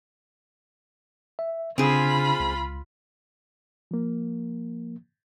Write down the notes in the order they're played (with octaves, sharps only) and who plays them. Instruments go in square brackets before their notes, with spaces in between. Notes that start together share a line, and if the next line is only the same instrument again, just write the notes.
[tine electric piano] E5
[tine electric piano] C#3 D4 [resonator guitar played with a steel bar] C4 G#4 [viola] F4 B5
[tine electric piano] C#2
[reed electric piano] F3 A#3